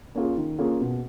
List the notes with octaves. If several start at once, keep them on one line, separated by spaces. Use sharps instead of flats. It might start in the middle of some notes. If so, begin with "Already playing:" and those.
A#3 C#4 F4 G#4
D#3
A#3 C#4 F4 G#4
B2